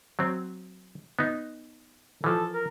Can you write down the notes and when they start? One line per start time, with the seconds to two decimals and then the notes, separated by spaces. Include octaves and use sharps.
0.19 F#3 C4
1.19 B3 D#4
2.24 E3 F3 A4
2.53 A#4